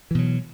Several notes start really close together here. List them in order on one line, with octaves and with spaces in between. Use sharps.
E3 B2 F#3